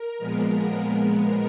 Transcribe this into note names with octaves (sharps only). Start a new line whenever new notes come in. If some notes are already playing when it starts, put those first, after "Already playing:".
Already playing: A#4
A#2 F3 G#3 B3
A#4